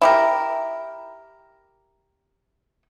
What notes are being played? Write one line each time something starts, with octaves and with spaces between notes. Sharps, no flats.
E4 G4 A#4